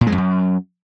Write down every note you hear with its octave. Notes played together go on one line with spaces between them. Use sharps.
A#2
G#3
F2
F#2